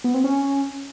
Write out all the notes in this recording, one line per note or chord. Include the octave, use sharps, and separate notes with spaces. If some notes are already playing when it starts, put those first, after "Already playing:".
B3
C4
C#4